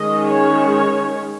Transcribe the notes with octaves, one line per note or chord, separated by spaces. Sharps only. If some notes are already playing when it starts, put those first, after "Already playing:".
Already playing: D#3 G#3 C#4 D#5
C#5